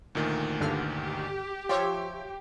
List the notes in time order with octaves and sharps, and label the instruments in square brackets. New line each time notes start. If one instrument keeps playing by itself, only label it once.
[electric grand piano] D2 A#2 D#3
[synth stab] G2 D3 F6 [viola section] G4
[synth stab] F3 C#5 E5 [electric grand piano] G5 C6 D6